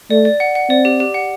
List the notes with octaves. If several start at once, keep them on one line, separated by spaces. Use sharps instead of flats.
A3 D5
D5
F#5
F#5
C4 D5
G4
G4
F#5